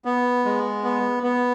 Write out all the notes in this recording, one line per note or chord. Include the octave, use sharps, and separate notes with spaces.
B3
G#3
B3
B3